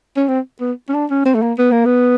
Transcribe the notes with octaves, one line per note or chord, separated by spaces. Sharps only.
C#4
C4
B3
C#4
D4
C#4
C4
A3
A#3
B3
A#3
B3